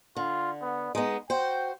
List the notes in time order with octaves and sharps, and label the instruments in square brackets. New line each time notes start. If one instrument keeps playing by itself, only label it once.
[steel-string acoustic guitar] D3 [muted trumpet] F4
[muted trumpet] B3
[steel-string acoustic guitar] G#3 B3 [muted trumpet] D#4
[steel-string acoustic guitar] F#4 C5 [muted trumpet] G5